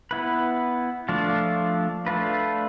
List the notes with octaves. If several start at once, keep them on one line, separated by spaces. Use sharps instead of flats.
B3 E4 B4
F3 A3 D4 F4
A3 D4 F4 B4